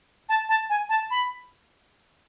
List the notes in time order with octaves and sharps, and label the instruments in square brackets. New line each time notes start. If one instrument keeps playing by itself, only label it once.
[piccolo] A5
A5
G#5
A5
B5